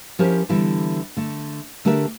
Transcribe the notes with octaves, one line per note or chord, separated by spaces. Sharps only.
F3 C#4 E4 G4 A#4 C5
D3 E3 G3 B3 E4
D3 A3
D3 A3 D4 G4 A#4 E5